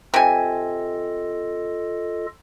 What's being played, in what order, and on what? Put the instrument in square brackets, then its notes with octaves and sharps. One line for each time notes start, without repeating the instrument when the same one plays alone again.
[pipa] C3 G#5 [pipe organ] F4 A4 D#5